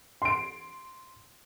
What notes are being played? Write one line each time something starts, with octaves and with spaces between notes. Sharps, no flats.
C6 D7